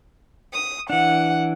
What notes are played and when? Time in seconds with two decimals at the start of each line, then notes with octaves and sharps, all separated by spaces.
0.53 D#6
0.90 E3 D4 F#5